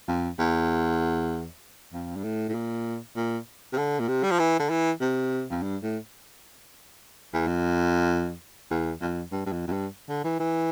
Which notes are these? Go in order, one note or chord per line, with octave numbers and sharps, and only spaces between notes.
F2
E2
F2
G2
A2
A2
A#2
A#2
C3
D3
A#2
C3
G3
F3
E3
D3
E3
C3
F2
G2
A2
E2
F2
E2
F2
G2
G2
F2
F2
G2
D3
E3
E3